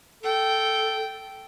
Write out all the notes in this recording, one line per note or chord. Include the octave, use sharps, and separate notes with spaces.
A4 G5